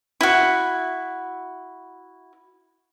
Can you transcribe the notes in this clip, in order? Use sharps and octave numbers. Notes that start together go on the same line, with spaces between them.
E4 F#4